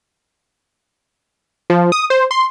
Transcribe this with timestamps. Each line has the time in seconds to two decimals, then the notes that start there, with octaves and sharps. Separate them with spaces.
1.70 F3
1.92 D#6
2.10 C5
2.31 C6